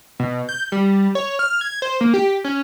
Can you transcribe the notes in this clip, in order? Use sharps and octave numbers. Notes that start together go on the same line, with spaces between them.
B2
G6
G3
C#5
F6
G#6
C5
A#3
G4
C#4